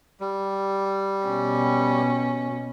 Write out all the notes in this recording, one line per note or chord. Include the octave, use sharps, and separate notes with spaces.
G3
B2 C#4